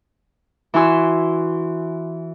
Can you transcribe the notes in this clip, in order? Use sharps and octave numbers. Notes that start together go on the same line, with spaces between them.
E3 E4 F#4 G#5 C6 E6